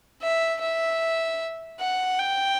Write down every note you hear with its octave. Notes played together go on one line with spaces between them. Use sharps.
E5
E5
F#5
G5